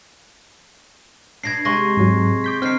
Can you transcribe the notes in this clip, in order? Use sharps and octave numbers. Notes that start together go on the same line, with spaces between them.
B2 D4 G#6 A#6 C7
C3 G#3 C6 C#6 A#6
G#2 F#3
D6 G6 B6
D3 A3 C4 D#4 F6 C7